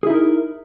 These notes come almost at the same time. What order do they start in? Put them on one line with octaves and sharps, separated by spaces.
G#4 E4 D#4 A#4